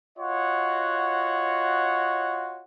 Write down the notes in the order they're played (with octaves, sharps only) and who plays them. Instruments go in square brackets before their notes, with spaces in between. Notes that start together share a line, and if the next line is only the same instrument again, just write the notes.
[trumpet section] F4 F#4 C#5 D#5 F#5